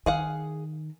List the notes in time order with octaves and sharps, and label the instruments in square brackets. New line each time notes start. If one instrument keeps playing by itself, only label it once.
[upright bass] D#3 [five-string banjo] G#4 F5 F#5